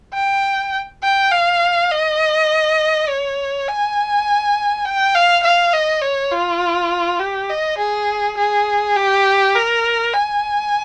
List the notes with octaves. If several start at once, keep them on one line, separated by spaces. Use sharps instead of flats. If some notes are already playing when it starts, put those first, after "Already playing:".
G5
G5
F5
D#5
C#5
G#5
G5
F5
F5
D#5
C#5
F4
G4
D#5
G#4
G#4
G4
A#4
G#5